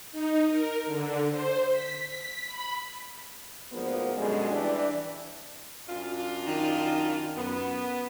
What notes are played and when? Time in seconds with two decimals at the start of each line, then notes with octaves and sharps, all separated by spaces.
0.12 D#4
0.49 A#4
0.86 D3
1.31 C5
1.72 B6
2.07 B6
2.46 B5
3.72 D2 G#2 F3 A#3 B3
4.16 F#2 B2 D3 G3 G#3
4.51 E3 G3 D4
5.88 F#2 D4 F4
6.47 D#3
7.37 F#2 B3